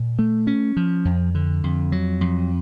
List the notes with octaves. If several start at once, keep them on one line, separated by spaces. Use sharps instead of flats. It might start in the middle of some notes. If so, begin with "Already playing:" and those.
Already playing: A#2
A3
C#4
F3
F2
D3
F2
F#3
F2